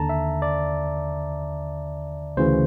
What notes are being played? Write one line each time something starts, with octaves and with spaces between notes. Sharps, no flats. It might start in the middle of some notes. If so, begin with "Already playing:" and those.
Already playing: D#2 D3 A5 A#5
E5
D5
D2 C#3 E3 C5